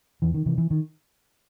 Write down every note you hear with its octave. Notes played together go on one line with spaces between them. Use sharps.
E2 E3
D#3
C3 E3
E3
D#3